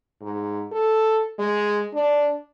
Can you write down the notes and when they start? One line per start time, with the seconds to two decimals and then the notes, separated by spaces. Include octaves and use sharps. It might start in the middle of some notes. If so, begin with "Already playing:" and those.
0.22 G#2
0.72 A4
1.39 G#3
1.94 D4